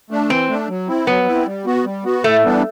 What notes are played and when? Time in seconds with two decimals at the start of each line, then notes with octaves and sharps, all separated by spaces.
0.10 A3 D4
0.29 E3 C4
0.49 A3 D4
0.69 F#3
0.88 C4 E4
1.07 F#3 B3
1.27 C4 E4
1.46 G3
1.66 B3 F#4
1.85 G3
2.05 B3 F#4
2.24 A2 A3
2.43 E3 G3 B3 D4